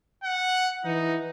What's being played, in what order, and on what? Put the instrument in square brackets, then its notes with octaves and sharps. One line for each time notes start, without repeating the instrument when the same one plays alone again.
[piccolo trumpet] F#5
[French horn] E3 [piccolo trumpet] D#4